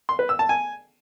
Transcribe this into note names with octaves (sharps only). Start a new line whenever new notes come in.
C6
B4
E6
A5
G#5